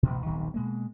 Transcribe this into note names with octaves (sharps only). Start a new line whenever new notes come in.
A1 D2 B2
D#1 B1 C3 D#3
B2 G#3 A#3